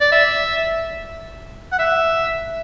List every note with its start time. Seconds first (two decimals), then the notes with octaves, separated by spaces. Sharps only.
0.01 D5
0.12 E5
1.72 F#5
1.79 E5